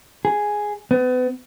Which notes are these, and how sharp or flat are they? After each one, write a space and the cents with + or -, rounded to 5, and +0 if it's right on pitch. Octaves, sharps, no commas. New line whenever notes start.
G#4 +0
B3 +35